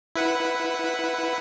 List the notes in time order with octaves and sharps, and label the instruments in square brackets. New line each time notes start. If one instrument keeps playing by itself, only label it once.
[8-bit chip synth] E4 B4 F#5